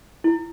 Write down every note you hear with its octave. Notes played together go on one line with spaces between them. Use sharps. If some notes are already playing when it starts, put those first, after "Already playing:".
E4